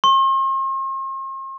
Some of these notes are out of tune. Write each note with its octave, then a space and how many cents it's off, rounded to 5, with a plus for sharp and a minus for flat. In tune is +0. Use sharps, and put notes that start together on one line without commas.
C6 +45